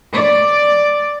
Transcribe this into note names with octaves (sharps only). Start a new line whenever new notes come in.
D5